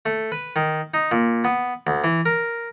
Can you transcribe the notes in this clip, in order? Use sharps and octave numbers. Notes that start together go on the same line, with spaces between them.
A3
B4
D#3
D#4
A#2
B3
D2
E3
A#4